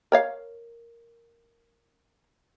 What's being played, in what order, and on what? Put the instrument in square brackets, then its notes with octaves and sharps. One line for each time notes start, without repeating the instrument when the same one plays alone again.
[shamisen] A#4 C#5 F5